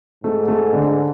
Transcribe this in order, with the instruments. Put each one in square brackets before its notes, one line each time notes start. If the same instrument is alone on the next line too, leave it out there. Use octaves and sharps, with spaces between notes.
[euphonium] G#2 [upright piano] A3
[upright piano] A3
D3